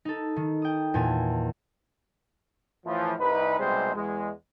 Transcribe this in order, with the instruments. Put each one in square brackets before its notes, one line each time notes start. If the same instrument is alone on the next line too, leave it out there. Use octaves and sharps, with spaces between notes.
[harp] D#4 A4
D#3
G5 D#6
E2 A#2 G#5 A5
[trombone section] A2 E3 F3
C2 D#4 B4
B1 C3 G3 G#3 G#4 C5
E2 G#3